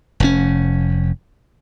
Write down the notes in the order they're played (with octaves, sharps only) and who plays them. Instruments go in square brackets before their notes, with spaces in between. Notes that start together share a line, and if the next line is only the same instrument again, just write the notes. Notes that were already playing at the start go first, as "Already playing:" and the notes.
[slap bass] F1 G#2 C#4